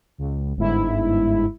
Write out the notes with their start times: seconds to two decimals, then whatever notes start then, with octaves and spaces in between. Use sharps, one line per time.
0.18 C#2
0.56 G1 G#2 E4